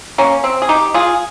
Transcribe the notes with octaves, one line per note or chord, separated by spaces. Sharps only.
A#3 C#4
C4
G#4
D#4 G4
F4 G#4